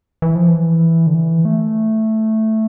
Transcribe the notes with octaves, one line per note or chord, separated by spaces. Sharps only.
E3
F3
E3
D3
E3
A3